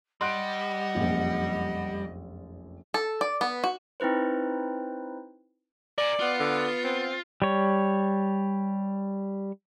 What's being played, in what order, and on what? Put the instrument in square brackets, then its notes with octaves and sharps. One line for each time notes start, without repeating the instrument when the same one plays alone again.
[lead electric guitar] G3 [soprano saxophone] D#5 [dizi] F#5 [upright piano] C6 F#6 D7
[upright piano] F1 A#1 F#2
[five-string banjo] A4
D5
B3
F#4
[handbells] C4 D#4 E4 B4 C5
[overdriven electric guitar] A#4 G#5 [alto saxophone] D5
[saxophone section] B3 [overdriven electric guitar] F4
[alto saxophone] D3
C4
[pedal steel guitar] G3 C#5